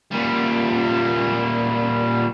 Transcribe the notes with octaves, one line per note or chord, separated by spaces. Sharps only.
A#2 G3